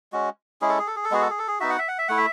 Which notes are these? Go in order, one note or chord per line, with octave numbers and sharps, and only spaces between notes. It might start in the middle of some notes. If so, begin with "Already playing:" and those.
G#3 C#4 F#4
G#3 C#4 E4 G#4
A4
G#4
A4
G#4
A4
G#3 B3 F#4 G#4
A4
G#4
A4
G#4
B3 D#4 F#4 E5
F#5
E5
F#5
E5
A3 E4 F#5
E5